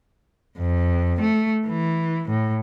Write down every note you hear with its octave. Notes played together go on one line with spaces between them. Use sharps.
F2
A3
E3
A2